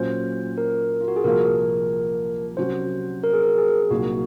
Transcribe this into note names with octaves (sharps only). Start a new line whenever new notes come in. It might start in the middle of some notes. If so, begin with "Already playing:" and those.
Already playing: A#2 F#3 C#4 F4 C5
A#4
F4
F#4
G#4
C2 A#2 F3 A#3 A#4
C3 F#3 C#4 F#4 C5
A#4
G#4
A#4
G#4
C2 A#2 F#3 A#3 D#4 F#4